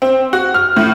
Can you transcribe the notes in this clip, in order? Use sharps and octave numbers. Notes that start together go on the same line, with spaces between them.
C4
F#4
F6
A2